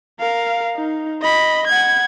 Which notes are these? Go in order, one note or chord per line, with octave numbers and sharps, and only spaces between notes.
A#4 F5
D#4
D#5 B5
F#5 G#6